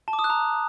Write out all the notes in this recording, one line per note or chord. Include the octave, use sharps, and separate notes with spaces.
A5
D6
D#6
F#6
A#5